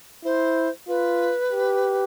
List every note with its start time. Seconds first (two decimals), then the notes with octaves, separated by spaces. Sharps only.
0.24 E4 C5
0.88 F4 B4
1.52 G4